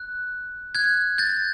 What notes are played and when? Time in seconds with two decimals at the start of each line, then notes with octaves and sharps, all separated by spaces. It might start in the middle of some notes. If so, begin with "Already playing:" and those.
Already playing: F#6
0.75 F#6 G#6
1.18 G6 A6